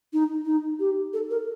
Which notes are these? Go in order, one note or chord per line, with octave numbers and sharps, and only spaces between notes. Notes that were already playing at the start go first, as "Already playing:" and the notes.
D#4
D#4
G4
A4
A#4